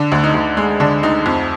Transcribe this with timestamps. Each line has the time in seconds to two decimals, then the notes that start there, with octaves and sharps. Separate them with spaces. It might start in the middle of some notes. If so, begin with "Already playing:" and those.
Already playing: D3 D4
0.12 D2
0.24 D#4
0.34 D2
0.57 G#3
0.80 D3 D4
1.03 D2 D#4
1.26 F2